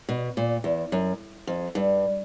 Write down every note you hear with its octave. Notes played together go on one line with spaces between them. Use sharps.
B2
A#2
E2
F#2
F2
G2